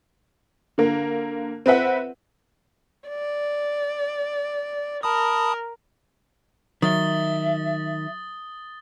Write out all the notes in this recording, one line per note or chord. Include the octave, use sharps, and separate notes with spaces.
D3 A#3
C4 B4 E5 F#5
D5
A#4 A5 B5 D#6
D#3 F#3 E5 D#6 A6 G7